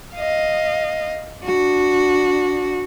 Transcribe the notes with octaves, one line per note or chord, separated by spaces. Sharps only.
D#5 F5
D4 F#4